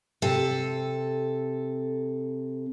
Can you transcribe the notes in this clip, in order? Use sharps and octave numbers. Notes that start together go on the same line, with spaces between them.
C3 A4